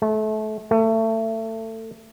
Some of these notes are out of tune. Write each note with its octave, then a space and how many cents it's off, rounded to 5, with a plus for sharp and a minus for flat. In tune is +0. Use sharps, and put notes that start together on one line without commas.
A3 -30
A3 +25